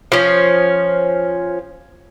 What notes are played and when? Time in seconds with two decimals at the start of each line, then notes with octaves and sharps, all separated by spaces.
0.12 F3 C#4